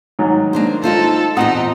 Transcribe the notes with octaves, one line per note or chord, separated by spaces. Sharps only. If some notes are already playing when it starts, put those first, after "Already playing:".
G#2 D#3 F#3
A#3 D4 C5
D#4 F4 A4 C5
E2 A#2 C4 D#4 D#5 F#5 D#6